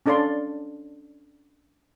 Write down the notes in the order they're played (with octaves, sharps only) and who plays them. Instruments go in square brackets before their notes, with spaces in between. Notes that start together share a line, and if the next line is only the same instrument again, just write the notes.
[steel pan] C#4 D4 A4 D5 F5 C6